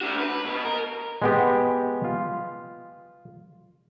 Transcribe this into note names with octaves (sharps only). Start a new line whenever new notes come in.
D4 F#4
B4
B2
A#4
G#3 B3 G4
F4